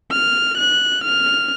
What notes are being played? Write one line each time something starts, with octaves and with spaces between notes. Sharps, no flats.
F6
F#6
F6